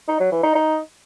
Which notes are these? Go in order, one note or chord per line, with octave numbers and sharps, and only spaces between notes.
D#4
F#3
E3
D#4
D#4